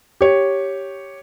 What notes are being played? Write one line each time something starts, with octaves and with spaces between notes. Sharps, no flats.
G4 C#5